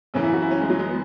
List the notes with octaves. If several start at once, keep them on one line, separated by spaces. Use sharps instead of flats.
F#2 C#3 E3 C#4
E4
F#4
E4
C#4
G#3
F#3
G#3
B3